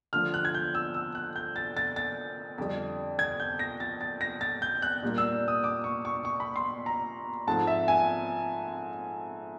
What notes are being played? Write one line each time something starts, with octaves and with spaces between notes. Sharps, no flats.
D3 F3 A3 D4 F6
F#6
G#6
G6
E6
E6
F#6
G6
A6
A6
A6
F2 D3 G3
G#6
G6
A#6
A6
A6
A#6
A6
G6
F#6
A#2 G3 A#3 D4
E6
D#6
D6
C#6
C#6
C#6
B5
C6
A#5
G#2 F3 A3 C4 A5
E5
G#5